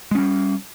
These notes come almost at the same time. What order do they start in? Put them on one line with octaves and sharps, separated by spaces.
G#3 C#4 G3